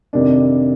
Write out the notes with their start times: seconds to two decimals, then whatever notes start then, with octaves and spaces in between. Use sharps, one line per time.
0.13 F2 C3 D#3 D4